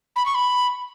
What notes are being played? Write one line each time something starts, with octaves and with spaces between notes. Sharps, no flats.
B5
C#6
B5